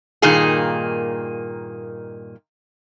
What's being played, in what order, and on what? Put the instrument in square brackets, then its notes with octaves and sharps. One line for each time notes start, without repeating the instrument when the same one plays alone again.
[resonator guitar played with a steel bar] G2 A#2 D#3 A#3 D#4 G#4